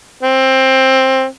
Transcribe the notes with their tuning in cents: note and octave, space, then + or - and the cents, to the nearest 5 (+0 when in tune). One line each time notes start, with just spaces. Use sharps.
C4 +15